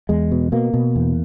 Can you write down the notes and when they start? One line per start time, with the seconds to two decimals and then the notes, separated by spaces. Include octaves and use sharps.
0.09 E2 G#3
0.32 B2
0.52 B2 A#3
0.74 B2
0.96 E2